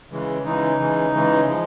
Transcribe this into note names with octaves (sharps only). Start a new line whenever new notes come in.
C#3 E3 G#3
C#3 E3 G#3 D#4
C#3 E3 G#3
C#3 E3 G#3
F3 G#3